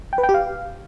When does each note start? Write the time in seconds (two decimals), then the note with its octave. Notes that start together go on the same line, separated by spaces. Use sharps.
0.13 G5
0.18 B4
0.23 G5
0.29 G4
0.34 F5